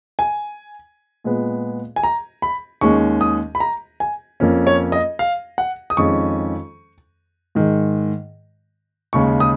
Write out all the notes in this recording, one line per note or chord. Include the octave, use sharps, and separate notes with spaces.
G#5
A#2 G#3 B3
G#5
A#5
B5
D#2 D#3 G#3 C#4 C#6
D#6
B5
A#5
G#5
F2 F3 A#3 C#4
C#5
D#5
F5
F#5
D#6
F2 D#3 G#3 C#4 C#6
G#2 D#3 G#3
D#2 C#3 G#3 C#6
D#6